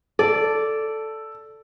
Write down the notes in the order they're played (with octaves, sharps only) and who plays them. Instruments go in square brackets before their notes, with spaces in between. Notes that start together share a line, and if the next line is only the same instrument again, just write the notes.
[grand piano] A4 [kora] D5